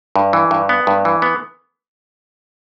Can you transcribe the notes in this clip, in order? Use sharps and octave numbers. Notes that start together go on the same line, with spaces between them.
G2
E3
G2
B3
G2
E3
B3